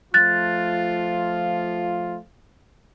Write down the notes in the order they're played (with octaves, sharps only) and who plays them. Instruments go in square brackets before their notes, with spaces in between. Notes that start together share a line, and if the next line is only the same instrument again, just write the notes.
[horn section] F3 A3 F4 [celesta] F#6 A6